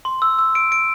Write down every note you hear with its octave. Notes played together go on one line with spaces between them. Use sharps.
C6
E6
E6
D7
D7